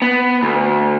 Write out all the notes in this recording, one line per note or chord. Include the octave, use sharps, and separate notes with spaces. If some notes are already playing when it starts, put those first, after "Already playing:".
B3
D2